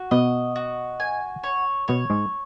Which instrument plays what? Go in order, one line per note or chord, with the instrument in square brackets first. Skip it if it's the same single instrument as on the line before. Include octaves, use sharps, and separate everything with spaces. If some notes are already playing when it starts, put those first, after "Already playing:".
Already playing: [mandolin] F#4
[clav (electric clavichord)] B2 B3 [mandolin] D#5
[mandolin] F#4
G#5
C#5
[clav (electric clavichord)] B2 B3 [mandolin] C#5
[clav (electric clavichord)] G#2 G#3